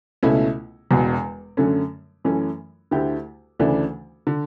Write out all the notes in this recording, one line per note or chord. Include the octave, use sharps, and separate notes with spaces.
C#2 B2 A3 C#4 E4
E1 E2 B2
F#2 D3 A3 C#4
F#2 E3 A3 C#4
D2 D3 A3 E4 G4
D2 C#3 E3 A3 D4
D3